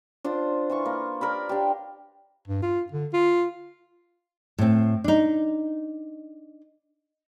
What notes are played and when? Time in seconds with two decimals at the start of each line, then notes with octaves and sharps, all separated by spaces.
0.25 D4 F4 C5
0.70 E3 F4 C#6
0.86 A#3
1.21 A#4 D5 B5
1.49 D4 G4
2.48 G2
2.63 F4
2.92 D3
3.14 F4
4.58 A2 C4
5.04 D4 D#4